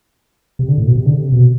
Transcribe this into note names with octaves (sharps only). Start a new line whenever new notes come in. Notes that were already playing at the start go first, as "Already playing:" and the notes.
C3
D3
A2
B2
C3
D3
C3
B2